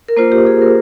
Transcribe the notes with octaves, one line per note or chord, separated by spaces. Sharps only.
A#4
A#3 F4 C5
G4
G#4
A#4